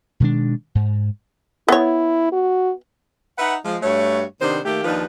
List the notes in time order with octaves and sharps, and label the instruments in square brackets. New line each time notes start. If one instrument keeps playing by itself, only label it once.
[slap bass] B2 D#3 G#3 D4
G#2
[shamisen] B3 C#5 [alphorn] E4
[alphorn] F#4
[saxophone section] D#4 B4 E5 F#5
F3 G#3
G2 A3 F#4 C#5
C3 D#3 B3 D4 C5
D#3 A3 A#3 G4
D#2 F3 D4 D#4 F4 B4